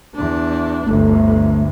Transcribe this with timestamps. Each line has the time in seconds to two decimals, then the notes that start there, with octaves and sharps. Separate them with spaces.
0.14 E2 D4
0.86 G1 D2 A3